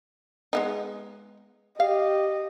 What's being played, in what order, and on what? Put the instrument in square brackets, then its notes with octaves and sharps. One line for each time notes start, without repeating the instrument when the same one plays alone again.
[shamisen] G#3 B3 D#4
[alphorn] G4 [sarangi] D#5 [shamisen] F5